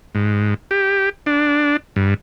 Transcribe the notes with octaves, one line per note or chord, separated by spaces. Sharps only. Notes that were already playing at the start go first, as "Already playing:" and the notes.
G#2
G4
D4
G2